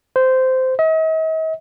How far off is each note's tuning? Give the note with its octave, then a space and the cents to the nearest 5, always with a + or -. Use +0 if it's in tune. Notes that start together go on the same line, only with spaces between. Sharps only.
C5 -15
D#5 +45